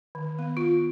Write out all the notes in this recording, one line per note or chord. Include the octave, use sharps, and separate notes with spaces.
D#3
B3
F4